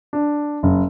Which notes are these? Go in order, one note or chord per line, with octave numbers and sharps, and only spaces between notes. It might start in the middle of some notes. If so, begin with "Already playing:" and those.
D4
F#1